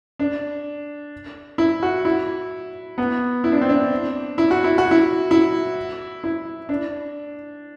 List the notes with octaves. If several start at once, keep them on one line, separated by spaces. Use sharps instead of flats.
D4
E4
F#4
E4
B3
E4
D4
C4
D4
E4
F#4
E4
F#4
E4
E4
E4
D4